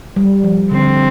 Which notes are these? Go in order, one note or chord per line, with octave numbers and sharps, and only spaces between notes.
G3
F3
D3 C4